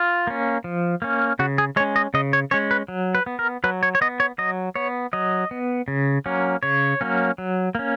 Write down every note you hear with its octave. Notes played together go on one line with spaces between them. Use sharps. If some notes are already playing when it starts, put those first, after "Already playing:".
Already playing: F4
A#3 C#4
F3
A#3 C#4
C#3 F#4
G#4
G#3 C#4 C#5
D#5
C#3 D#5
C#5
G#3 C#4 C#5
B4
F#3
B4
B3
A#4
F#3 B4
C#5
C#5
B3 D#5
C#5
F#3 D#5
B3 C#5
F#3 D#5
B3
C#3
F#3 A#3 C#4
C#3 C#5
F#3 A#3 C#4
F#3
A#3 C#4